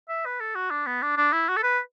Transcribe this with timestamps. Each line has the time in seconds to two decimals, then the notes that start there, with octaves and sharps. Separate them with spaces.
0.09 E5
0.26 B4
0.41 A4
0.55 F#4
0.71 D4
0.87 B3
1.02 D4
1.17 D4
1.33 E4
1.49 F#4
1.57 A4
1.63 B4